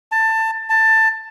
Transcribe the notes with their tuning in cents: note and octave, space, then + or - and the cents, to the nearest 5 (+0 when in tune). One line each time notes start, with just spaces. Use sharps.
A5 +20
A5 +15